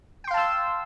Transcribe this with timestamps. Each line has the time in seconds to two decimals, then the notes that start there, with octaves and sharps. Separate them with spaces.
0.24 G5
0.27 C6
0.31 F5
0.34 A5
0.37 E6